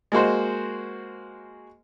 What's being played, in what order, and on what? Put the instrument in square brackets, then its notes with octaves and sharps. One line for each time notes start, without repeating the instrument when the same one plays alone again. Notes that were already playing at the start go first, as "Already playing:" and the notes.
[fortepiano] G#3 A#3 F#4 C5